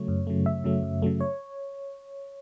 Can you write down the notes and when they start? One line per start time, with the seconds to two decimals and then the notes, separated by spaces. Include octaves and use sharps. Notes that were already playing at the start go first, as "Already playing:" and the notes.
Already playing: C#3 F#3 A3 C#5
0.08 F#2
0.27 C#3 F#3 A3
0.46 F#2 E5
0.64 C#3 F#3 A3
0.83 F#2
1.02 C#3 F#3 A3
1.20 C#5